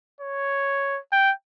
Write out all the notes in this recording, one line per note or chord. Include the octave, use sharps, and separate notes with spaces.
C#5
G5